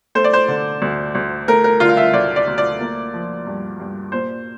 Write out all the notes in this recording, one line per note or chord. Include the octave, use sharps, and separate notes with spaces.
A3 C5
D5
C5
D3
D2
D2
A3 A#4
A#4
D3 F4
F5
E5
D2 D5
D5
D2
D5
A#3
F3
G2
G2
A#2 C5